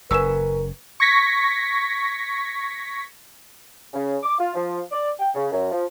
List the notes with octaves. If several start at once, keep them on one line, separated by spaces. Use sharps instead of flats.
F#1 C#3 A#4 B4 G#5 C#6 E6 E7
C#6 G#6 A#6 B6
C#3
D6
F4
F3
D5
G5
C#3
F#2
F3